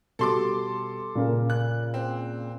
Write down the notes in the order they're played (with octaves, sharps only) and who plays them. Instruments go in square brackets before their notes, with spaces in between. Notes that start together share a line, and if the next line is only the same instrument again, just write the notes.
[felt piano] B2 G3 [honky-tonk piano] A4 C6 D6
[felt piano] A#2 C#3 A#4
[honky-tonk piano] F#6
C4